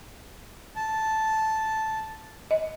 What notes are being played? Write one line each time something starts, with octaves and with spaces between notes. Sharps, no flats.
A5
D#5